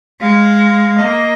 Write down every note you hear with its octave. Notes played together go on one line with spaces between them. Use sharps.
G#3 F5
A#3 D#5